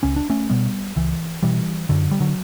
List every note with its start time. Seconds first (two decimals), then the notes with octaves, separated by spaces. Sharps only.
0.03 C#2 C#4
0.16 D4
0.30 A3 C#4
0.50 B2 G3 B3
0.96 C#2 E3
1.43 B2 E3 G3
1.89 F#2 D3 F#3
2.11 G3
2.20 D3 F#3